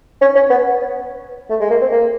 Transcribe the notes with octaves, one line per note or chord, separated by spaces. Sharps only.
C#4
C#4
B3
A3
G#3
A#3
C4
A#3